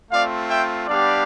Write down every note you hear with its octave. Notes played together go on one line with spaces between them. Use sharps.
A3 C4 F4 D5 F5
E5 G5
G3 B3 D4 G4 D5 F5